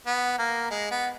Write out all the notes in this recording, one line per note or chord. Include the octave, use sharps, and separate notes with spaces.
B3
A#3
G#3
B3